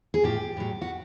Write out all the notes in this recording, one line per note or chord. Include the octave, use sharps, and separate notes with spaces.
G#4
A2 F3 G4
A2 F#3
F#4